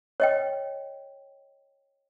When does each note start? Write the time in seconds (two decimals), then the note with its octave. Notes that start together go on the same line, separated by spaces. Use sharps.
0.20 C#5 D#5 G5